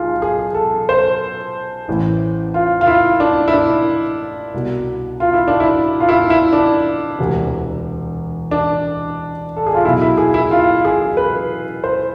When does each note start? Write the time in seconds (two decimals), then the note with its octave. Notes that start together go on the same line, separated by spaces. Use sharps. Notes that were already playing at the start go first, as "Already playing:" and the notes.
Already playing: B1 F4 G#4
0.22 G#4
0.54 A4
0.89 C5
1.88 A1 A2 E3
2.54 F4
2.81 F4
2.87 E4
3.20 D4
3.48 E4
3.53 D4
4.54 C2 B2
5.20 F4
5.34 E4
5.48 D4
5.60 E4
6.00 F4
6.09 E4
6.30 E4
6.53 D4
7.19 E1 D2 C3 E3
8.51 D4
9.57 A4
9.67 G#4
9.75 F4
9.85 B1 B2 E4
10.02 E4
10.17 G#4
10.34 E4
10.51 F4
10.85 G#4
11.17 B4
11.84 C5